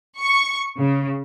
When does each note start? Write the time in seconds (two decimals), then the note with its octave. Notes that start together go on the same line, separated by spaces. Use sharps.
0.18 C#6
0.78 C#3